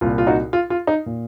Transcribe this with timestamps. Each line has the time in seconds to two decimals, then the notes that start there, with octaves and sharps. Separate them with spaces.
0.01 C2 A#2 F4
0.18 F4
0.27 D#4 F#4
0.53 F4
0.70 F4
0.87 D#4
1.06 A#2